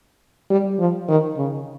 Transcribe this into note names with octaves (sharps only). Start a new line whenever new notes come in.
G3
F3
D#3
C#3